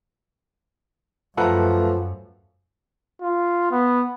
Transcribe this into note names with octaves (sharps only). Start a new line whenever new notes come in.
F#2 F3 A3 A4 B4 F#5 A#5
F4
B3